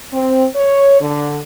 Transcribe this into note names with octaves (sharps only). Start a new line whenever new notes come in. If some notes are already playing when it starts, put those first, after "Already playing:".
C4
C#5
D3